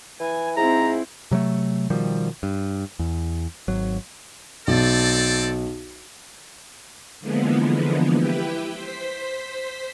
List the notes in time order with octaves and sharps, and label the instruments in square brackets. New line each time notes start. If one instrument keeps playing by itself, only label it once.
[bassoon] E3 [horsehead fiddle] G#5
[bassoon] G#2 [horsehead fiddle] C4 [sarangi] E4 [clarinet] A#5
[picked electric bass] C3 F#3 G3 A3
B2 D#3 F3 G3
G2
E2
G#1 F#3
[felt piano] B1 [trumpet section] C4 A4 D5
[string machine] D3 E3 F3 G#3 A#3 B3
E4 G4 B4 G5
C5 B6